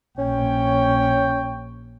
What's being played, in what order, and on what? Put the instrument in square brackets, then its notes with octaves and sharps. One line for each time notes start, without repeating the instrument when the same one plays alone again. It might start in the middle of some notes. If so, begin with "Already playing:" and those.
[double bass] A#1 [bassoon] C#4 [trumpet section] C#5 G5